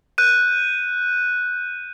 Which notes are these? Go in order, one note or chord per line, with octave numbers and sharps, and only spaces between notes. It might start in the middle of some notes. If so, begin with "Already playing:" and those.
F#6 G6 D#7